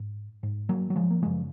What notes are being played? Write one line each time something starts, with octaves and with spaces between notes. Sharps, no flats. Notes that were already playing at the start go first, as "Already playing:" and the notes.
Already playing: G#2
G#2
F#3 A#3
F#3
F3 G#3
A#3
F#2 C#3 F3 G#3